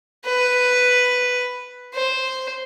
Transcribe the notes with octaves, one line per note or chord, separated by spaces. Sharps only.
B4
C5